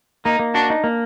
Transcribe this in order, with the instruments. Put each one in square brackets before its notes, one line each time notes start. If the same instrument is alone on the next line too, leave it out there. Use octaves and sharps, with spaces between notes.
[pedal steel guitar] A#3 [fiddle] D#4
[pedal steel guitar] A#3
[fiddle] D4 [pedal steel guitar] F#4
[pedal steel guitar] D#4
A#3